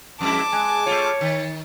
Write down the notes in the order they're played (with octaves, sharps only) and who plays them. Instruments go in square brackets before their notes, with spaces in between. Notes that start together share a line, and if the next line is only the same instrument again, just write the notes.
[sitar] F2 G#3 E4 [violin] A5 D6
[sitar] G#3 [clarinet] G#5
[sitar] A3 F4 [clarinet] C#5
[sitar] D#3